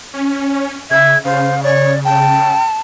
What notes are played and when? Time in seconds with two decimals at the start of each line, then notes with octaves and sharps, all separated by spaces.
0.14 C#4
0.91 C#3 E5 G#6
1.25 C#3 C5 F5
1.63 C#5 D5
2.04 G5 A5